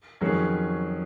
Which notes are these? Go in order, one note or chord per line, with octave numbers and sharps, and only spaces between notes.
F2 D#3 F#3 C#4 G#4